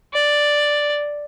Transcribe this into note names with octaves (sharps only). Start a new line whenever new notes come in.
D5